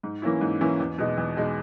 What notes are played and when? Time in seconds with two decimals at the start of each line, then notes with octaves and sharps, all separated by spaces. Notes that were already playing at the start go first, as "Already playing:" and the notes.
0.03 G#2
0.22 E3 A#3 C#4 E4
0.41 G#2
0.61 E3 A#3 C#4 E4
0.80 E2
0.98 B2 G#3 D#4
1.17 E2
1.37 B2 G#3 D#4